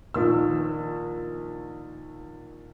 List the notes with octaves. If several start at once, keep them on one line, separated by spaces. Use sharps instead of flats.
A#1 D#3 E6